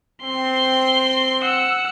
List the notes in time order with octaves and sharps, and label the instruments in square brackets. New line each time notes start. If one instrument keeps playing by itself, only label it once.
[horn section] C4 [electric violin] C6
[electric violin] F#5 E6